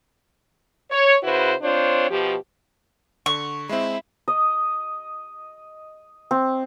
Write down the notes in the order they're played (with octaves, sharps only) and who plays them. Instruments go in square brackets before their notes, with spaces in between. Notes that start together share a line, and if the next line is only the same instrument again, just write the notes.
[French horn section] C#5
C#3 E4 F#4 B4 C5
C4 D4 F4 C5 C#5
B2 F3 G4
[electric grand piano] D3 [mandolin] C#6
[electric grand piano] G#3 C4 [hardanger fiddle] E4
[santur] D#5
C4